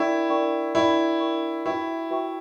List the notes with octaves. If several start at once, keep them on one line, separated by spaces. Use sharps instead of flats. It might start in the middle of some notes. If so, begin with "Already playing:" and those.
Already playing: D4 E4 A#4 D5 G5 C#6
D4 A#4 D5 G5 C#6
D4 E4 A#4 D5 G5 C#6
D4 A#4 D5 G5 C#6
E4 F#4 B4 E5 G5 C#6
F#4 B4 E5 G5 C#6